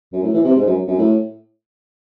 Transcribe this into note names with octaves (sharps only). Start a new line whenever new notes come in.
F#2
A2
E3
C3
G#2
F#2
F#2
A2